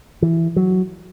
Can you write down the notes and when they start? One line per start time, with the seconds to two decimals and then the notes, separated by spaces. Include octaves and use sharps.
0.22 E3
0.56 F#3